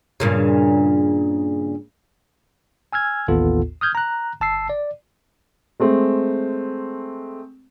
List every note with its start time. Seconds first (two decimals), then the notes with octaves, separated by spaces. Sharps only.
0.20 G2 A#2 C#3
2.93 G#5 E6 F6 G#6
3.28 A1 D#2 A2 B3 F4 A4
3.81 D#6 F6 G6 G#6
3.95 A#5 F#6
4.41 G1 A5 E6 C7
4.70 D5
5.80 G#3 A3 C4